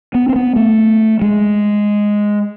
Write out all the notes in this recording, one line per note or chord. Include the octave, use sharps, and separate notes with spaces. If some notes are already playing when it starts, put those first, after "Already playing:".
B3
C4
B3
A3
G#3